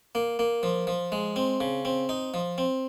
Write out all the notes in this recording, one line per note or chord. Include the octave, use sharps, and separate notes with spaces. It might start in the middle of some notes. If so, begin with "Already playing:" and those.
A#3
A#3
F3
F3
G#3
C4
C#3
C4
D#4
F3
C4